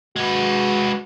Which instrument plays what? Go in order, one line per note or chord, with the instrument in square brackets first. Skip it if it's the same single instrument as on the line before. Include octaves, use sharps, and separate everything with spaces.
[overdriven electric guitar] G#3 B4 [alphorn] F#4